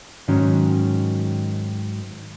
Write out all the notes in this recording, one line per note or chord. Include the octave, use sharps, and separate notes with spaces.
G#2 D#3 F#3 C#4